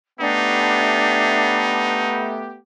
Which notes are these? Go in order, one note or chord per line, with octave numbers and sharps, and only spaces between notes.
A3 B3 D4 D#4 G4